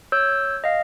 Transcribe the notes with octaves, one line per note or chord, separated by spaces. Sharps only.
C#5 E6 G6
D#5 F5